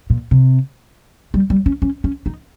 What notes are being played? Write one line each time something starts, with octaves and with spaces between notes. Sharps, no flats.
A#2
C3
G3
G3
C#4
C#4
C#4
D#4